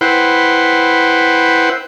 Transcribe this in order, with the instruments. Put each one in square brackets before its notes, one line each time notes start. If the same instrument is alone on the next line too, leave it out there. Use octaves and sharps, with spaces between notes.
[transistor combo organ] E4 B4 C5 F#5 G5